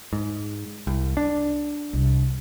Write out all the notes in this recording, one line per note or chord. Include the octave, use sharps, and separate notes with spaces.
G#2
C2
D4
C2